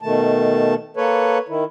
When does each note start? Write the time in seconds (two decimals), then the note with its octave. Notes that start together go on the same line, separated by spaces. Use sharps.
0.01 B2 D#3 A3 A5
0.97 A#3 A4 B4 C#5
1.48 D#3 E4